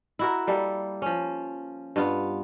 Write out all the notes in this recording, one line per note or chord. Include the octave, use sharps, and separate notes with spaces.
E4 F#4 A#4
G3 A#3 A4
F3 C#4
G2 B3 F4